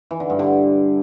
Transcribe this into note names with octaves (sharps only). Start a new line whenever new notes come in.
E3
D3
G2
D3